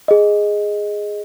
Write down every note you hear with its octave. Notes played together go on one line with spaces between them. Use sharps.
G#4 D#5